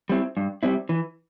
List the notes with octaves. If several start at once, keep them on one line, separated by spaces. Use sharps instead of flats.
G3 C4 E4
G2
G3 C4 E4
E3